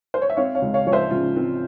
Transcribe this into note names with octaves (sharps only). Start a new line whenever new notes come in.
C5
C#5
E5
C4 C#5 F5
C#5 F5
C#2
C#5 F5
F3 C#5
C5 E5
C#3 F4
C4